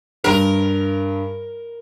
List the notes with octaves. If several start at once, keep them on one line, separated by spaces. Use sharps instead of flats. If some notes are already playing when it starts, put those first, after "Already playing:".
G2 A#4 F7